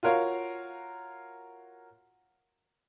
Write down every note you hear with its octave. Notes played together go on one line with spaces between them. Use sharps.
F4 F#4 A#4 C#5 F5